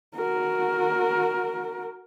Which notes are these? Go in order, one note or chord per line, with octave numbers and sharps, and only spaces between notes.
F#4 A#4